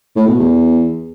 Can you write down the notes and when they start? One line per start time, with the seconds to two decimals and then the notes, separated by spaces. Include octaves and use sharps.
0.16 A2
0.28 B2
0.39 E2